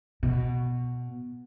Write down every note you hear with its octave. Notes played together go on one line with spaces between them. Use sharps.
B2